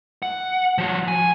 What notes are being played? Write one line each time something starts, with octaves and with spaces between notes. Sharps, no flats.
F#5
F3 F#4
G#5